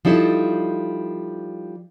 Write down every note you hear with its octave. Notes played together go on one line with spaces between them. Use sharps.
F3 G3 D#4 E4 A4